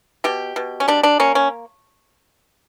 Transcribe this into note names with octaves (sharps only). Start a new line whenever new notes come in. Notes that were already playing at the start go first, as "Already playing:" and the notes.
B2 G4
B2
C#4
G3 D4
D4
A#3 C#4
C#4